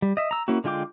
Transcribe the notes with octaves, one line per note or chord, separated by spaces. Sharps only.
G3
D#5 E5
A#5 E6
A#3 C#4 E4 F#4
D3 G#3 F4 G5 D6